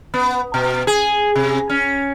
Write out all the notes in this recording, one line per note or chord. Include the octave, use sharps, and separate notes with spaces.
B3
B2
G#4
C3
C#4